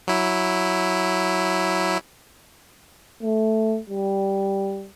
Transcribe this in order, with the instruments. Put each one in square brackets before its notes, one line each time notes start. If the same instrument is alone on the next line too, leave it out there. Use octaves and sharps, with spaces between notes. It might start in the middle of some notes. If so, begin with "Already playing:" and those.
[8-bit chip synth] F#3 E4
[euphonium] A3
G3